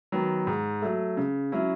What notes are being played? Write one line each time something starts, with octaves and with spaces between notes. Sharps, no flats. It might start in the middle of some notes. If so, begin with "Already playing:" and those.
D#3 F#3 B3
G#2
F#3 A3
C#3
F#3 C#4 E4